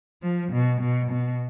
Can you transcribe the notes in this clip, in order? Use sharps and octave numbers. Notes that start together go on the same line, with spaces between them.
F3
B2
B2
B2